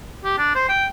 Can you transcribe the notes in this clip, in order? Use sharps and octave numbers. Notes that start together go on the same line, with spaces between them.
G4
D4
C5
G5